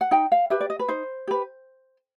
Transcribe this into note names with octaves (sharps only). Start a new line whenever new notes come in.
F#5
D#4 G5
F5
G4 B4 E5
D5
D#5
B4
D#4 C5
G4 B4